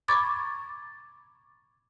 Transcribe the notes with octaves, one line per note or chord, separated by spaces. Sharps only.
A#5 B5 C#6 D6 G#6 A6